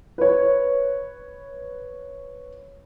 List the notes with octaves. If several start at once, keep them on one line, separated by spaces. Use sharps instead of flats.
B4 C#5